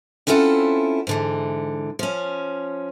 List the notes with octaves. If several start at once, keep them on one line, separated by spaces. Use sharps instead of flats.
C4 C#4 E4 F4 A4 F#5
G#2 D3 E3
F3 C#4